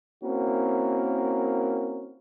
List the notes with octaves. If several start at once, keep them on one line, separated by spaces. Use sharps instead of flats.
A#3 C4 C#4 E4 F#4 A#4